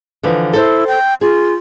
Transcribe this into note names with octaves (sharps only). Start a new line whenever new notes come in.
D3 E3 F3
E4 A4 C5
G5
F4 G#4